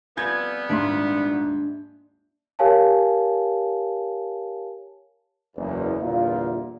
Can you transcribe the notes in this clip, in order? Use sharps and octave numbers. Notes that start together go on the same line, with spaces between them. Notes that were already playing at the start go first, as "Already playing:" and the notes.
F2 G3 B3 F4 G#5 G6 G#6
D#1 G#2 D4 E5 C6
G4 A#4 C#5 F5 G#5 A5
F#1 E2
G1 E2 A#2 A#3 F4